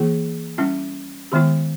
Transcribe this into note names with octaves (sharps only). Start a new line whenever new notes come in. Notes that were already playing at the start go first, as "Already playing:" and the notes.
Already playing: E3 A#3 E4 G#4
G3 C#4 E4
D#3 G#3 B3 E4 G4